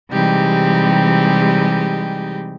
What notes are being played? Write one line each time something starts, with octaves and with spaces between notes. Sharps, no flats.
C3 E3 G3 G#3 D#4 G4